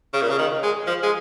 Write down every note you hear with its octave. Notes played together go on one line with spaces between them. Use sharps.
C#3
A#2
C#3
D#3
G#3
F3
G#3